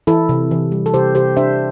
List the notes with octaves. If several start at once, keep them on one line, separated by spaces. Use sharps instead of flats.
E3 E4 A4
C3
E3
G3
A4
C3 G4 C5
C3 G4 C5
D4 C5 E5